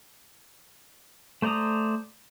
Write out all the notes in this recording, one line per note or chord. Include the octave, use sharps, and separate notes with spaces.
A3 C5 D5 A#5 D#6